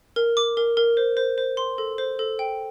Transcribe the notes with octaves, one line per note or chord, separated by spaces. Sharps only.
A#4
D6
A#4
A#4
C5
C5
C5
C6
A4
C5
A4
G5